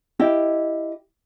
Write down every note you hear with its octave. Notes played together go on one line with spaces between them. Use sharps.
E4 G4 D#5